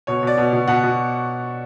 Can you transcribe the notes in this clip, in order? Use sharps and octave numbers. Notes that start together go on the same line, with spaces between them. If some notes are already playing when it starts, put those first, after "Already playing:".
B2 C#5
B2 D5
B2
B2
B2 F#5
B2